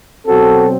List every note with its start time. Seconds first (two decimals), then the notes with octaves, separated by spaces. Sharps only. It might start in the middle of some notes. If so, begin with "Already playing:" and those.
0.25 B2 F#3 C4 F#4 A4